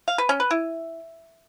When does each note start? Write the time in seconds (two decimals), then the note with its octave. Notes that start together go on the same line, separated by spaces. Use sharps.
0.08 F5
0.18 B4
0.29 C#4
0.40 B4
0.51 E4